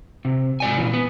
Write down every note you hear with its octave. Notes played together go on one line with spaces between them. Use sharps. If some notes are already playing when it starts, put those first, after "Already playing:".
C3
G#2 D5 G#5
A#2 E3
B3